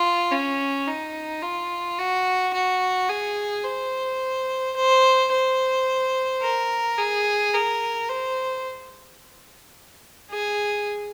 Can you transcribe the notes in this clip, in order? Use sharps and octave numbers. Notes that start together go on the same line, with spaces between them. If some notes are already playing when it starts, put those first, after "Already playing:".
Already playing: F4
C#4
D#4
F4
F#4
F#4
G#4
C5
C5
C5
A#4
G#4
A#4
C5
G#4